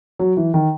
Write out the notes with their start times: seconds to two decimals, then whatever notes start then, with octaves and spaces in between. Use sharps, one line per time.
0.19 F#3
0.37 E3
0.54 D#3